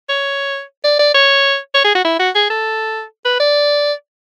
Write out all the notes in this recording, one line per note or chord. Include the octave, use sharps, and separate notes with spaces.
C#5
D5
D5
C#5
C#5
G#4
F#4
E4
F#4
G#4
A4
B4
D5